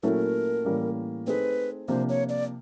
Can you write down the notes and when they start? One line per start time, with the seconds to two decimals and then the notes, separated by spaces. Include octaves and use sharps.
0.03 A#2 F#3 A3 C#4 E4 A#4 B4
0.65 A2 E3 G3 A#3 C#4
1.27 A3 C4 D#4 G#4 B4
1.88 C3 F3 A#3 D4 C5
2.09 C#5
2.29 D5